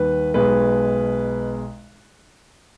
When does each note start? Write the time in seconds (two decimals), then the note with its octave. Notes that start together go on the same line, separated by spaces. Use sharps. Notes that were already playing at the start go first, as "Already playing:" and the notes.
Already playing: D#2 D#3 G3 B4
0.34 B1 B2 G#3 B4